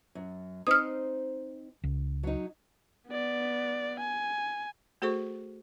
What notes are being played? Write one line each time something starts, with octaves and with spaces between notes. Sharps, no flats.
F#2
C4 D#4 C5 D#6 F6
C#2
F#3 D#4
B3 D5
G#5
A3 F#4 G#4 A4 C5 C#6